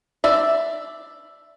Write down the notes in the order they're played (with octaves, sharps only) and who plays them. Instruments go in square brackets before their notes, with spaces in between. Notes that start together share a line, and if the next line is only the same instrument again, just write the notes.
[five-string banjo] D5 E5